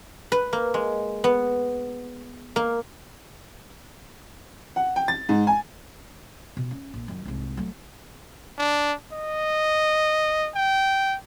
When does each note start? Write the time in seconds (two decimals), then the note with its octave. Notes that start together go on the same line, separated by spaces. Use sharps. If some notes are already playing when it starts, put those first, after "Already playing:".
0.32 B4
0.53 A#3
0.74 G#3
1.24 B3
2.56 A#3
4.76 F#5
4.96 G5
5.08 A6
5.29 G#2
5.47 G#5
6.57 B2
6.71 C#4
6.94 A#1
7.08 F#2 D#3
7.25 C2 G#2
7.57 F#3 A3
8.58 D4
9.12 D#5
10.55 G5